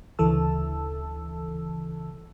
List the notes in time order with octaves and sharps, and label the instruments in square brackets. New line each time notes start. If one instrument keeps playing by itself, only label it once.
[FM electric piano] D2 C#3 E3 A4 A5 E6